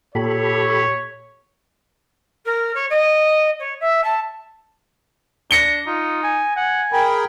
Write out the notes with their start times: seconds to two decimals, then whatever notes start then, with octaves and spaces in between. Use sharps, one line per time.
0.15 A#2 G4 A4 C#5 B5
2.45 A#4
2.74 C#5
2.90 D#5
3.59 C#5
3.80 E5
4.03 A5
5.51 D4 A#6 C#7 G7
5.87 D#4 F4
6.23 G#5
6.56 F#5 G#5
6.92 G#4 A#4 G5 B5